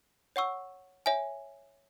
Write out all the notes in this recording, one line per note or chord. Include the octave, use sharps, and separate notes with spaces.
C#5 F#5 C#6 E6
C#5 E5 G#5